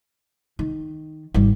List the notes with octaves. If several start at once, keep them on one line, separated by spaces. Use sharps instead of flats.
D#3
G#1 G3